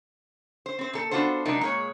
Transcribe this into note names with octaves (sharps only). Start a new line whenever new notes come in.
C5
C4 C5
A#2 A4
B3 D4 F4 F#4 A4 C5
C3 F#3 G#3 D4 D#4 A#4
A#2 G#3 C#5